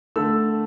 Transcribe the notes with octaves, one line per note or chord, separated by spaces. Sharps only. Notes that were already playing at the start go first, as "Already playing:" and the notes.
D3 A3 E6